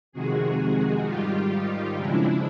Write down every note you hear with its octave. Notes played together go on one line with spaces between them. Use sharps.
F2 C3 D#3 G#3 F#4 G#4
G#2 D#3 G3 F4 G4
D#4 F4
F2 C#3 F3 G#3 D4 E4